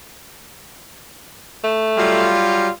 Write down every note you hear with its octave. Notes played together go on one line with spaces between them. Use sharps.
A3
F#3 G3 F4